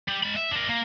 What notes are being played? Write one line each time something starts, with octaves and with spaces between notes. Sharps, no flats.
G3
G#3 B5
E5
D4 A#4
A#3